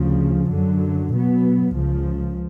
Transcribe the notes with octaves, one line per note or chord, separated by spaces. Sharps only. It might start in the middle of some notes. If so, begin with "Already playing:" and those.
Already playing: D2 C#3 F3
F#2 D3 F#3
B2 F#3 B3
C#2 C#3 F3